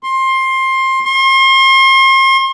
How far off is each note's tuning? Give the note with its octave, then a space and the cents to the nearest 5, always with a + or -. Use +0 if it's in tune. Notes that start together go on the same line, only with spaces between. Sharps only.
C6 +20
C6 +40